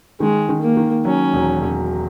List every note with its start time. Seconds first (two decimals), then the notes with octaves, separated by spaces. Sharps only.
0.20 D#3 G#3
0.49 D#3
0.62 A#3
0.77 D#3
1.05 F#3 C#4
1.33 E1
1.61 E1